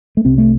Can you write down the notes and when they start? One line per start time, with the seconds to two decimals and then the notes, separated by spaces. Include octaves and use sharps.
0.17 A3
0.25 C2 C3 C4
0.38 A3